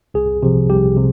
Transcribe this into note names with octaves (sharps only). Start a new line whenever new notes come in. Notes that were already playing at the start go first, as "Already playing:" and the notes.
C2 G#4
C3 F3
C2 G4
C3